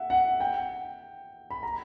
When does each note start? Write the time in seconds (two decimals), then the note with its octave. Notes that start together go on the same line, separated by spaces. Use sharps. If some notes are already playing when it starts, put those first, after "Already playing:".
Already playing: E5 F#5
0.10 F#5
0.40 G5
1.51 B5
1.63 A#5